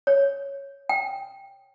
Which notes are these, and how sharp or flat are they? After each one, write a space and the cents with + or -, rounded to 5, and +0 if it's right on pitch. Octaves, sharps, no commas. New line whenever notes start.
C#5 -5
G5 +5